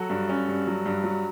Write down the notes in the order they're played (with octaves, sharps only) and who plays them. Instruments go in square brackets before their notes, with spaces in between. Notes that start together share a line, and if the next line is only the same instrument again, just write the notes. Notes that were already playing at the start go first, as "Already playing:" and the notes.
Already playing: [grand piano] F#3 F#4 A4
G2
C#4
G2
F#3
G2
F#3